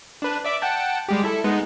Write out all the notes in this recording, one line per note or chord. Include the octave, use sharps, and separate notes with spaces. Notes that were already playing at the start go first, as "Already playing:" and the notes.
D4 B4
D5 E5 D6
F#5 G5 A5
G3 G#3 G4
E4 A4
G#3 B3 D#4